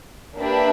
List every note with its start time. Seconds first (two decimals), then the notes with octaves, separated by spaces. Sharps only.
0.37 A#3 D4 G4 B4 E5